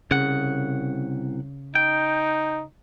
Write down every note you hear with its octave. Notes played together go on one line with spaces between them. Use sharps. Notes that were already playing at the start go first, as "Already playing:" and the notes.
C2 C#3 F#5
D#4 G5